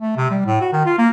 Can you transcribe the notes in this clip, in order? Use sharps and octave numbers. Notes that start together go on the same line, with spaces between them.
A3
C3
G3
A2
F#4
D#3
F4
A#3